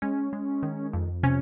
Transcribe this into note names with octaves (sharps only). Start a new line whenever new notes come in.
G#3 C#4
G#3
D#3
F2
C3 C#4